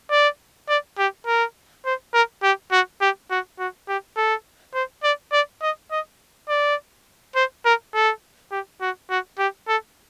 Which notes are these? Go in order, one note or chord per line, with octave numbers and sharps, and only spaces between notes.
D5
D5
G4
A#4
C5
A#4
G4
F#4
G4
F#4
F#4
G4
A4
C5
D5
D5
D#5
D#5
D5
C5
A#4
A4
G4
F#4
F#4
G4
A4